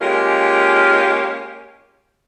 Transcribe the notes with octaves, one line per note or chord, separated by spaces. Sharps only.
G#3 A#3 C#4 F4 G4